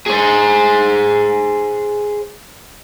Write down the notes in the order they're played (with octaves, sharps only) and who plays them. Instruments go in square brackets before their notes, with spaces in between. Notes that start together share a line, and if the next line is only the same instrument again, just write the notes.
[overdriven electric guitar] G#4 C5